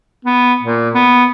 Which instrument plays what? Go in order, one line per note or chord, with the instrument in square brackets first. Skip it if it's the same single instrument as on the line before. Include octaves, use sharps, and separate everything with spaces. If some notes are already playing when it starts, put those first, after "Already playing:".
[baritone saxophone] B3
A#2
B3